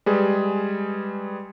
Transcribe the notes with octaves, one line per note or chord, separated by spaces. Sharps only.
G3 G#3 G#4 B4